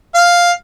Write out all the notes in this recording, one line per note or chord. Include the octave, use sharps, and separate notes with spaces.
F5